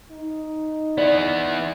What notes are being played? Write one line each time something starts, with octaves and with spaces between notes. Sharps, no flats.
D#4
B3 E4 D5